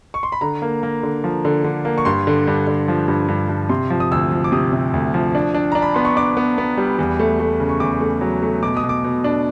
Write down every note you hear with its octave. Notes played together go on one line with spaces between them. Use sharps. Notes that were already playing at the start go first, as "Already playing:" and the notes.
C#6
C6
B5
D3 A#5
A#3
A#3
D3
F3
D3
D3
A#3
C#6
G2 C6
D3
G2
D3
F3
G2
G2
G2
C3 C6
F3
D#6
D2 E6
F3
D6
C3 D#6
C3
D2
F3
D4
D4
D4 A#5
B5
B3 C6
C#6
D4 D6
B3
B3
G3
E2
A3
A3
C#3
C#6
E2 D6
A3
F#3
A3
B2 D6
D#6
B2
D6
B2
D4